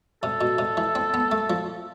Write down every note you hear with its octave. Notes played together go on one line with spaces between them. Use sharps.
C3 A4
B2
C3
E3
C4
B3
A3
F3